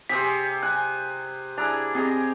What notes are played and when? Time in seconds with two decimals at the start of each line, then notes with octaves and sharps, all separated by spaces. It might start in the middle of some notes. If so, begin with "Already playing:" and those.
0.09 C3 G4 G#4 C5 B6
0.63 G#5 F#6
1.57 D4 E4 G#4 A#5
1.95 C4 G4 G#4 D#5 A#5